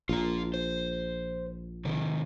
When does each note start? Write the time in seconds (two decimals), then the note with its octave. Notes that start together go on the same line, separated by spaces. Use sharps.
0.09 A#1 F4 A#5
0.54 C5
1.85 C3 D#3